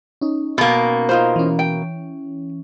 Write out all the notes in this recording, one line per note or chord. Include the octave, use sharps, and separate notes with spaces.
C#4 D#4
B2 A#3
D#4 F4 C5
E3 C#4
G5